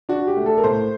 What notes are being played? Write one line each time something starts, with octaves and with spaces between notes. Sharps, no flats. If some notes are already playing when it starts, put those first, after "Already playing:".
D4 F#4
G4
A3
A4
A#4
A2 C5